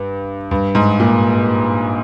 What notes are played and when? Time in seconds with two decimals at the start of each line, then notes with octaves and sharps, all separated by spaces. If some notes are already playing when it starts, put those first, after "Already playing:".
Already playing: G2
0.51 G2
0.75 G#2
1.00 A#2